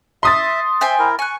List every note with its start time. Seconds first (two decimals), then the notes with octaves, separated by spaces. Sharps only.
0.23 E5 C6 D#6 A6
0.81 C5 E5 G5 G#5
0.99 E4 A#4
1.19 G#5 C#6 F#6